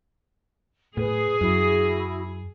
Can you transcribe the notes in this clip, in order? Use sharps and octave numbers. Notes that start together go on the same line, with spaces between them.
A2 G#4 B4
F#2 E4 F#4